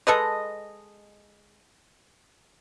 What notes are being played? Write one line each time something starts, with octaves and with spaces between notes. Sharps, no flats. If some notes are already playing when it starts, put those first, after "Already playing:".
G#3 A4 B4 D#5